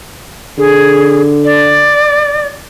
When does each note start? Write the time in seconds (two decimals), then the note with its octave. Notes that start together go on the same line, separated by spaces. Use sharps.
0.58 D3 G#4
1.44 D5